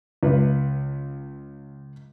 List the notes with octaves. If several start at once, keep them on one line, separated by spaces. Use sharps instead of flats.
C#2 B4